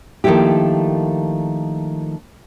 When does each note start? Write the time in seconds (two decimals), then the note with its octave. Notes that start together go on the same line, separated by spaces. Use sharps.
0.24 D#3 F3 A3 A#3 E4 G4